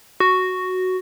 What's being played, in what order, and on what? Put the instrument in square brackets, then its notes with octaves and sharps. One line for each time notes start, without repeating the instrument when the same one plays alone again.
[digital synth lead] F#4